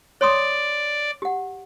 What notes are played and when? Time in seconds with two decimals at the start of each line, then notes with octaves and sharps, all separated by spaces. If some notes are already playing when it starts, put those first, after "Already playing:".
0.21 C#5 D5 C6 D#6
1.22 G4 F#5